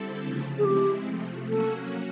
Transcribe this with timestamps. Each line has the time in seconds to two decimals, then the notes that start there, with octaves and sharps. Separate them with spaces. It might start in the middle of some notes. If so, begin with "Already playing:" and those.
Already playing: D3 G3 C4 E4 A4
0.24 C#3 F3 A3
0.58 G#4
0.65 G#3 C4 E4 G4
1.07 C3 F3 A3
1.48 F#3 A#3 C#4 F#4 A4